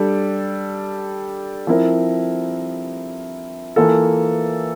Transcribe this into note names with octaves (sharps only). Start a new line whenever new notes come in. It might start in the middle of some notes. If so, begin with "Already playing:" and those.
Already playing: G3 D4 A4
F3 C4 E4 A#4
E3 A#3 F4 A4